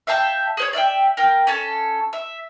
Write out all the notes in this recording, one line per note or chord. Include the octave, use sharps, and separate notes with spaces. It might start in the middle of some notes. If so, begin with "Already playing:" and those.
E5 F5 G5 A5
G#4 C5 C#5
D5 E5 F5 G5
A#4 G5 F6
C#4 A4 A5
E5